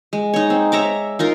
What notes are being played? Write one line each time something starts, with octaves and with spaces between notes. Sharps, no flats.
G#3
D#4 C#5
C4
C#5 E5 A#5 D6
D#4 F4 A#4